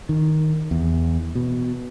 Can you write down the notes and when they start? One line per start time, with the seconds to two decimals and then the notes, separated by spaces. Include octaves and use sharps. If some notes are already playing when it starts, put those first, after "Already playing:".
0.09 D#3
0.71 E2
1.35 B2